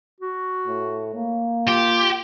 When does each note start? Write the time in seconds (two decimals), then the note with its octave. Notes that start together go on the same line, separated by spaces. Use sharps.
0.20 F#4
0.67 A2
1.15 A#3
1.67 F4 G4